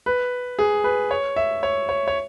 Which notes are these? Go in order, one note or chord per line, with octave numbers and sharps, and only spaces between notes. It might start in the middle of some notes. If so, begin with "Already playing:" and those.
B4
G#4
B4
C#5
E5
C#5
C#5
C#5